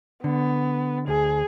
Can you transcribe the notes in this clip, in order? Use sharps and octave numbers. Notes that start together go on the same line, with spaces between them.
D3 B3
D2 G#4